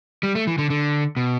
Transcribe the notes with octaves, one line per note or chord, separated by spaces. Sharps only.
G3
A3
E3
D3
D3
B2